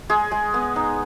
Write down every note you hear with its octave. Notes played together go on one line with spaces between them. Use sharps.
G#3 G#4
G#3
B3
D#4